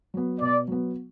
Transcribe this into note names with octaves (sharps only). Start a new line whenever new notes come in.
F#3 B3
B2 D5
F#3 B3